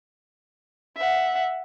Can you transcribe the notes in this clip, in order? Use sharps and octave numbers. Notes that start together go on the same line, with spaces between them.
E5 F#5